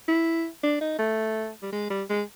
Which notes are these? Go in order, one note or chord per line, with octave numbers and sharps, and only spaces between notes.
E4
D4
D#4
A3
G3
G#3
G3
G#3